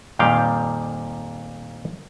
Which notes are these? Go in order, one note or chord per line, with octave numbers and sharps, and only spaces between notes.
F2 A#2 D#3 G3 F5 G5